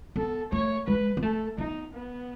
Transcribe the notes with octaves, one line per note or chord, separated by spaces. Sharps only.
B3 A4
A3 C#5
G#3 B4
B3
A3 A4
B3 D#4
B3